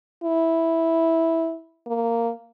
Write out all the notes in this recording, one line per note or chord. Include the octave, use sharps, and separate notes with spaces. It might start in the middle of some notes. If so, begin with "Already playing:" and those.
E4
A#3